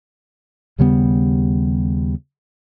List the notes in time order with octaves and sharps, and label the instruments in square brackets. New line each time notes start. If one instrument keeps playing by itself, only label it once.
[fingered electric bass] D#2 C#3 G3 B3